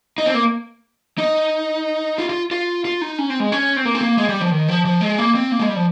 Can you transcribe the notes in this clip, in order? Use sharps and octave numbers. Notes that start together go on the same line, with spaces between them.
D#4
C4
A#3
D#4
F4
F4
F4
F4
D#4
C#4
C4
G#3
C#4
C4
A#3
C4
A#3
G#3
G3
F3
D#3
F3
F3
G#3
A#3
C4
A#3
G#3
G3
F3